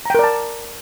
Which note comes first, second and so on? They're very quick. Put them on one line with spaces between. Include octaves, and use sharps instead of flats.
A#5 G5 A#4 D5 A5